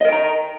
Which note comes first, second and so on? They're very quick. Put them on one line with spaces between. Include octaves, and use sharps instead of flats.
D#5 A#4 G5 A#5